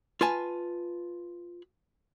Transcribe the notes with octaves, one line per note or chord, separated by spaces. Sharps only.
F4 B4 G#5 A5